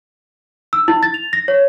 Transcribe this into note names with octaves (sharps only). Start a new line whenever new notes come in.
E6
E4
A6
F7
A#6
C#5